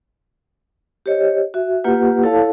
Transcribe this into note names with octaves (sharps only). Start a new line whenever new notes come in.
G4 C5 C#5 D#5
F#4 E5
A#3 F4 G4 B4 F#5
E4 A4 C#5 F5 A5